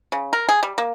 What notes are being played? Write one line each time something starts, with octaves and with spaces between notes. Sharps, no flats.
C#3
A#4
G#4
G3
A#3